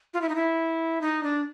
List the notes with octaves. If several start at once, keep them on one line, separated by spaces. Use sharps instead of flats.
F4
E4
D#4
E4
D#4
D4